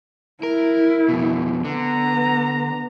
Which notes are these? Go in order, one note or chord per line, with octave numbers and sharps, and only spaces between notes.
E4 A#4
F2 B2
D3 B3 A#5